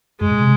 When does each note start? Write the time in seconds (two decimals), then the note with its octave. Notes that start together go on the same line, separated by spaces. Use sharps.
0.21 G2 G#3
0.31 A#2
0.41 C3